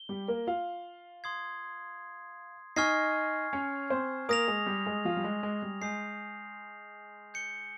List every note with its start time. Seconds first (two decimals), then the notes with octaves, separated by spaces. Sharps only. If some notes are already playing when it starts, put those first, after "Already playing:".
Already playing: G7
0.09 G3 G4
0.28 A#3 A#4
0.47 F4 F5
1.24 C6 D#6 G#6 C7
2.76 D#4 D#5 G#5 C#6 F6 G#6 C7
3.53 C#4 C#5
3.90 C4 C5
4.29 A#3 A#4 D#6 A#6 F7
4.48 G#3 G#4
4.66 G3 G4
4.86 G#3 G#4
5.05 F3 F4
5.17 G3
5.24 G#3
5.43 G#3
5.62 G3
5.81 G#3 G#5 D#6 G6 C7
7.34 G6 C#7 G7